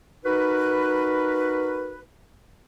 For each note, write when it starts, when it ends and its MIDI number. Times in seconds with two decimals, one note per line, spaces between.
0.25 2.01 63
0.25 2.01 66
0.25 2.01 70
0.25 2.01 71